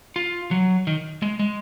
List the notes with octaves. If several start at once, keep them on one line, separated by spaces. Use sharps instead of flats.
F4
F#3
D#3
G#3
G#3